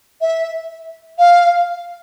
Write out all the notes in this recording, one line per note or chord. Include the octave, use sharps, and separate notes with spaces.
E5
F5